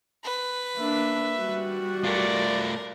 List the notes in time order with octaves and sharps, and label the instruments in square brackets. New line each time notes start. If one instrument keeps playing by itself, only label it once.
[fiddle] B4
[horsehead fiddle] A#3 D4 [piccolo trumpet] E5
[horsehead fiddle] G3 F#4
[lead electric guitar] A3 F4 [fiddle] A#4 [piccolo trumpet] D5